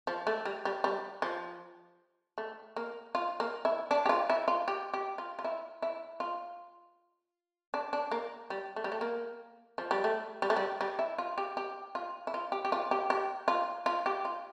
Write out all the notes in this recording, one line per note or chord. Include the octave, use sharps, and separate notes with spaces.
F3
A3
G3
G3
G3
F3
A3
A#3
F4
A#3
E4
D4
G4
F4
E4
F4
G4
G4
F4
F4
E4
E4
F4
D4
D4
A#3
G3
A3
G3
A3
A#3
F3
G3
A3
G3
A3
G3
G3
E4
F4
G4
G4
F4
E4
F4
G4
G4
F4
G4
G4
F4
F4
G4
F4